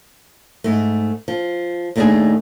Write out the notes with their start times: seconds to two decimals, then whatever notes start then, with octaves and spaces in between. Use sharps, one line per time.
0.64 G#2 A3
1.28 F3
1.96 D#2 A2 A3 D4 D#4 G#4